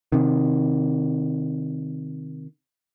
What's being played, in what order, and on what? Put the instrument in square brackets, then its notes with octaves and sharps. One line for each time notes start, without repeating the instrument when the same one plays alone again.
[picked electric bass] C3 D#3